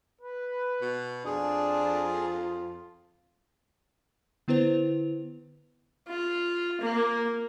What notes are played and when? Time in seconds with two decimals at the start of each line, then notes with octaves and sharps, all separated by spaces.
0.21 B4
0.81 B2
1.25 F2 D4 F4 G#4
4.48 D3 B3 E4 B4 C5 F7
6.08 F4
6.81 A#3